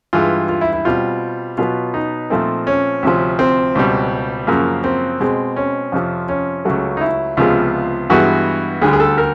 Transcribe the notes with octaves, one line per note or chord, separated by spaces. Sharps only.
G2 E3 G#3 F4
F4
E4
E4
B2 G3 C4 F4
B2 F#3 B3 F4
D#4
A#2 F3 A3 C4
C#4
D2 C3 F3
C4
C#2 B2 G3
F#2 C#3 F3 A#3
C4
B2 G#3 C4
C#4
F2 C3 F3
C#4
C#2 C#3 F#3 A3
D#4
E4
C#2 C3 F3 G#3 B3 F4
G2 E3 G#3 B3 F#4
D2 D3 G3 G#4
G#4
A4
A#4